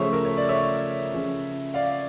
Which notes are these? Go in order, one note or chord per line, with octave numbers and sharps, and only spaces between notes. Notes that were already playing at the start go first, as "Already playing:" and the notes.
Already playing: C#3 F3 A3 C#4 C#5 E5
A#4
C#5
D5
C#5 E5
C#3 F3 C#4
D5 F5